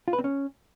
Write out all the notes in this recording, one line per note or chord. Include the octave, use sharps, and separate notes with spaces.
F4
B4
C4
C#4